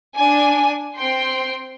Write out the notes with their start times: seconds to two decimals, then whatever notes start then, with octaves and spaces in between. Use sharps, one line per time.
0.15 D4 G#5
0.96 C4 G5 C6